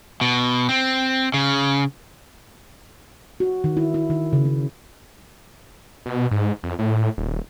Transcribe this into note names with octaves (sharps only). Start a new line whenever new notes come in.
B2
C4
C#3
F#4
D#3
E4
E4
D#3
C#3
C#4
B2
G#2
F2
A2
D#1